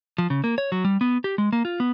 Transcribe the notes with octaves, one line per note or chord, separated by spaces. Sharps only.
F3
C#3
A#3
C#5
F#3
G3
B3
G4
G#3
A#3
F4
B3